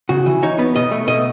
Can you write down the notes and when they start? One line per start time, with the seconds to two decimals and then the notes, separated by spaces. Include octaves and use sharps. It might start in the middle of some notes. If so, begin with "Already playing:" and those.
0.09 C#3 F#4
0.26 E3
0.43 D#4 C#5
0.59 B3
0.76 B2 D#5
0.91 A3
1.08 B2 D#5